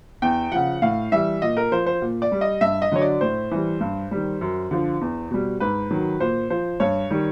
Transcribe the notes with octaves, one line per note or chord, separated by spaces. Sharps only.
E2 G5
C#3 F3 F#5
A2 F5
E3 G3 E5
A#2 D#5
A#4
F3 C5
C5
A#2
D5
G3
D#5
G2 E5
D#5
D3 F#3 C#5
D5
A2 C5
E3 G3
G2
D#3 G3
F#2
D3 F3
E2
B2 G3
G#2 B4
D#3 F#3
A#2 C5
F3 C5
G2 C#5
D#3 G3